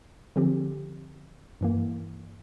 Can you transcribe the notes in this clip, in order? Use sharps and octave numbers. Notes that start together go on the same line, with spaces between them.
D3 F3 C4 G4
G2 E3 A#3